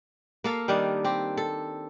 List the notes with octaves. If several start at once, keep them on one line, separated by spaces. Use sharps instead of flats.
A#3 A4 F5
D#3 G3 D4 D#4
C4 G4
A4